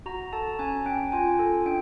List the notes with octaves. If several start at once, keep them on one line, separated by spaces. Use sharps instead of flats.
F#4 A#5
A4 A5
C#4 G#5
C#4 G5
F4 G#5
A4
D4 G5